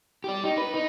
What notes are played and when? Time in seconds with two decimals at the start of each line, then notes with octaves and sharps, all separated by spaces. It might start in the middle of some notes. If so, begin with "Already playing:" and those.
0.24 G4 D5
0.43 D#4
0.58 B4
0.74 D#4